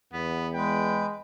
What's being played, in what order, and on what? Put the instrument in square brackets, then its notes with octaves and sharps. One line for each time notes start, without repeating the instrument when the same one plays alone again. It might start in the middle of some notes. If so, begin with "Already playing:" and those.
[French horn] E2 [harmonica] B3
[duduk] G#3 [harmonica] B4 G5